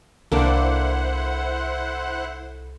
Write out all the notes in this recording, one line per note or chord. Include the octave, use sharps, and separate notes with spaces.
C2 A#3 D4 E4 A4 C5 F5 F#5